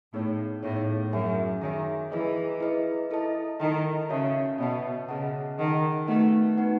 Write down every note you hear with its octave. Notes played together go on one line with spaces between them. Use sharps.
A2 B3 D#4 G#4 C#5
A2 B3 D#4 G#4 C#5
F#2 G#4 C#5 E5 G#5
D#3 G#4 C#5 E5 G#5
E3 E4 G#4 B4 D#5
E4 G#4 B4 D#5
E4 A4 D#5 A5
D#3 E4 A4 D#5 A5
C#3 F#4 C#5 E5 A5
B2 F#4 C#5 E5 A5
C#3 G#4 D#5 F#5 A5
D#3 G#4 D#5 F#5 A5
A3 B3 D#4 F#4 B4 F#5
B3 D#4 F#4 B4 F#5